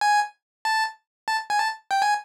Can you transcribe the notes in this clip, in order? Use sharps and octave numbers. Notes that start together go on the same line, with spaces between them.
G#5
A5
A5
G#5
A5
G5
G#5